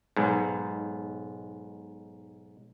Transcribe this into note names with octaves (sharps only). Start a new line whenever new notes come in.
B1 G#2